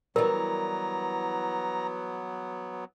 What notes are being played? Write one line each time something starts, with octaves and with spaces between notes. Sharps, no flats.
E3 F#3 G3 B3 A#4 A#5